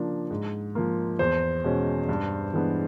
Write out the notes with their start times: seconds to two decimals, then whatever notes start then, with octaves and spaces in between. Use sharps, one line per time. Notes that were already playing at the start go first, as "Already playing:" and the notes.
Already playing: C#3 F3 A#3 D4
0.31 G#2
0.75 F3 A#3
1.19 E2 C5
1.64 B2 G#3 C#4
2.09 G2
2.53 E3 G#3 B3 D4